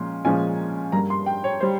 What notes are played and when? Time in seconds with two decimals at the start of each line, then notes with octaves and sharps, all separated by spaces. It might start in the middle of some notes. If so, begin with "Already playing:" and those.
Already playing: A#2 F3 G#3 C#4 C6
0.25 A#2 F3 G#3 C#4 F4 G#5
0.92 G2 G3 A#3 A#5
1.10 C6
1.26 G5
1.44 C#5
1.61 G3 C5